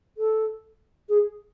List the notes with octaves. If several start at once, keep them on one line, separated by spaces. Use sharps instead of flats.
A4
G#4